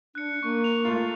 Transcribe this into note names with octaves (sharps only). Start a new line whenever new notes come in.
D4 F#6 C#7
A#3 C#6
F7
A3 F4